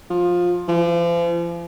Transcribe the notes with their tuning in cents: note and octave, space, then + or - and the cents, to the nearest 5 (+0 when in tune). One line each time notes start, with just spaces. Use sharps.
F3 +15
F3 -40